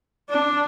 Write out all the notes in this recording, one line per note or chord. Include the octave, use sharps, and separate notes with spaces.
D4